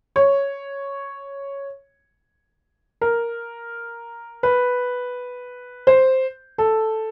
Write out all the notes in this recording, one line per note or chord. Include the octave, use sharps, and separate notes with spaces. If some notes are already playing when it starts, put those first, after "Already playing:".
C#5
A#4
B4
C5
A4